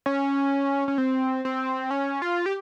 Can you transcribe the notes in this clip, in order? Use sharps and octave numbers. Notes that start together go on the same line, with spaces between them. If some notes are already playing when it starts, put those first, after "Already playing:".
C#4
C#4
C4
C4
C#4
F4
G4